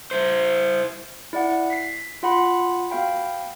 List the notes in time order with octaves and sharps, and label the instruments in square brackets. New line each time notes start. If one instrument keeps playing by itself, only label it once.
[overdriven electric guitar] E4 C5
[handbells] E4 D5 F#5
B6 C7
F4 F#5 B5 C6
B3 F#4 F5 G5 B5